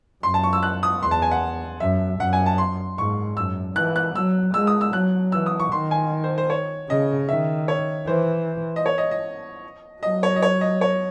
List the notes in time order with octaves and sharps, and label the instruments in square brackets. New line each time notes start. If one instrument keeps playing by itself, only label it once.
[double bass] F#2 [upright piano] C6
[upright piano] A5
C#6
E6
F#6
D#6
[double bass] E2 [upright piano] C6
[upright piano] A5
G#5
F#5
[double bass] F#2 [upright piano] E5
[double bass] F#2 [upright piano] F#5
[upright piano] G#5
A5
C6
[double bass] G#2 [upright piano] C#6
[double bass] F#2 [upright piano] E6
[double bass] E3 [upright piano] F#6
[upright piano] F#6
[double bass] F#3 [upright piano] E6
[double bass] G#3 [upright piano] E6
[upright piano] D#6
E6
[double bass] F#3 [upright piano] F#6
[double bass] E3 [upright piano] E6
[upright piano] D#6
C#6
[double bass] D#3 [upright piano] C6
[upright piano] G#5
C5
C5
C#5
[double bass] C#3 [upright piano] D#5
[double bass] D#3 [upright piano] E5
[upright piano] C#5
[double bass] E3 [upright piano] C5
[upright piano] D#5
C#5
D#5
D#5
[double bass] F#3 [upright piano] D#5
[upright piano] C#5
D#5
C#5
D#5
C#5